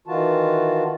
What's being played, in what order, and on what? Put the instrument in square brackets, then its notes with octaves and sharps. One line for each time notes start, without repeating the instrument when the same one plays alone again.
[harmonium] D#3 E3 F4 F#4 A5